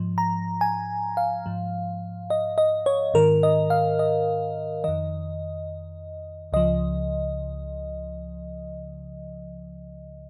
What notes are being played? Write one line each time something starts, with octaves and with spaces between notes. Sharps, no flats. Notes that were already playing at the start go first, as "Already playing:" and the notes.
Already playing: G#2 F3
A#5
G#5
F5
G#2 F3
D#5
D#5
C#5
G#2 D#3 A#4
D#5
F5
D#5
F2 D#3 D#5
C#2 C#3 F3 D#5